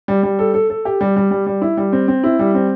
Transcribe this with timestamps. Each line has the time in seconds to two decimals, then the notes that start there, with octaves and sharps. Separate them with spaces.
0.08 G3
0.23 G3
0.39 A4
0.54 A4
0.70 A4
0.85 G4
1.01 G3
1.16 G3
1.31 G3
1.46 G3
1.62 E4
1.77 G3
1.92 C4
2.08 C4
2.24 E4
2.39 G3
2.55 C4